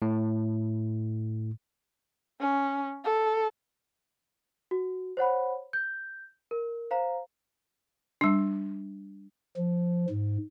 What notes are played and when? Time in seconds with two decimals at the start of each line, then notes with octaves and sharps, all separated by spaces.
0.02 A2
2.40 C#4
3.04 A4
4.71 F#4
5.17 C5 C#5 F#5 B5
5.73 G6
6.51 A#4
6.91 C5 F5 A#5
8.21 G3 D4
9.57 F3
10.10 G#2